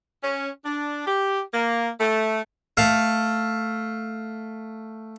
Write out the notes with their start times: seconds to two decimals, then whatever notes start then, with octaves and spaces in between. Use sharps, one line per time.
0.23 C#4
0.65 D4
1.06 G4
1.53 A#3
2.00 A3
2.77 A3 F5